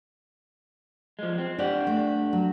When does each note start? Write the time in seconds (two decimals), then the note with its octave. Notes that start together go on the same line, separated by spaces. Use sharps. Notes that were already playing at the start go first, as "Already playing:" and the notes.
1.19 F3 G#3
1.38 C4
1.59 D4 G4 D5 F#5
1.87 A3
2.33 F#3